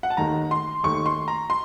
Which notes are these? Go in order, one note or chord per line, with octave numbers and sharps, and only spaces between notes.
F#5
A5
D#2 D#3 A3 A#5
C6
D#2 D#3 A3 C#6
C6
A#5
C6